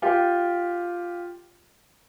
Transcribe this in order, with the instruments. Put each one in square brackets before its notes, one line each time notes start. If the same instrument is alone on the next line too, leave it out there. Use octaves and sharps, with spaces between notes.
[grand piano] F4 G4